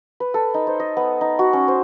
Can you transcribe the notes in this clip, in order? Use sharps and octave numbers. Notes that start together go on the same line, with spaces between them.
B4
A4
D#4
C5
D#5
B3
D#4
F#4
C#4
C5